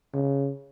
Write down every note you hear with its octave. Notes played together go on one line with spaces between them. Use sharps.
C#3